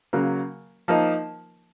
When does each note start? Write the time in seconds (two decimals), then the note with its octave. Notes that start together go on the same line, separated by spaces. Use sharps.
0.13 C#3 F#3 A#3
0.88 F3 A#3 D#4